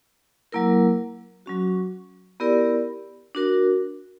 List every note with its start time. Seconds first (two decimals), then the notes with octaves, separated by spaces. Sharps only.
0.52 F#3 A#3 E4 A#4
1.46 F#3 C#4 F#4
2.40 B3 E4 G4 A#4 D5
3.35 D4 F#4 A#4